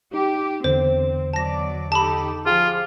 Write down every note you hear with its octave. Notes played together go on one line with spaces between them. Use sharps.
D#4 G4
E2 D3 C4 C5
B2 F#3 D5 A5 A#6
D#4 G4 A4 A5 B5
F3 F4 G4 G#4 F5